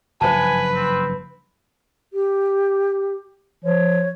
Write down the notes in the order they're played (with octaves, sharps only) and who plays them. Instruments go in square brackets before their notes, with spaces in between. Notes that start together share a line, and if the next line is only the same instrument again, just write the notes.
[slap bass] F#1 G2 F3 [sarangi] B4 [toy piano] C5 F5 A5 [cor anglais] G#5
[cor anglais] C4
[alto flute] G4
[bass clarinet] F3 [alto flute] C#5